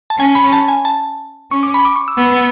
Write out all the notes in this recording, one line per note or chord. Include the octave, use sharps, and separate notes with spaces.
A5
C#4 G#5
B5
A5
G#5
A5
C#4 C#6
D6
B5
D6
C#6
E6
B3 E6